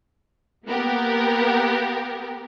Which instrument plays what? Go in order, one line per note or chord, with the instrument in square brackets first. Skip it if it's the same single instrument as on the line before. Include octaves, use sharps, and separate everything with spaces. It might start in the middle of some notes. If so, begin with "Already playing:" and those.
[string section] A#3 B3 G4 A#4